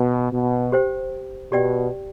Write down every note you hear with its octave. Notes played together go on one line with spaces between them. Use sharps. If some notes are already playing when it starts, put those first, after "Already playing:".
Already playing: B2
B2
G4 C5 G5
B2 G4 D5 G5